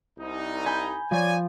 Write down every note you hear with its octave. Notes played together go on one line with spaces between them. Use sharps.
C2 D#4
G#5 B5 G6
F3 C#5 D5 G#5